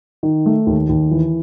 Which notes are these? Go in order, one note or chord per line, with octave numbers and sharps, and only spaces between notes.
D#3
A3
D#2
D#2
E3